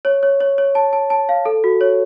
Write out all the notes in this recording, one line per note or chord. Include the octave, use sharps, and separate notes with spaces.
C#5
C#5
C#5
C#5
A5
A5
A5
F5
A4
F#4
C#5